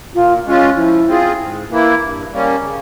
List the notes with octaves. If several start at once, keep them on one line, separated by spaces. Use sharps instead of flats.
A#2 F4
G#3 C#4 F4
F3 E4
C4 F4 G#4
G#2
E3 A#3 E4
G2
G3 A#3 C#4
C#3